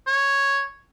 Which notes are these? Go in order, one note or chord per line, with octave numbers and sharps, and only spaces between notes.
C#5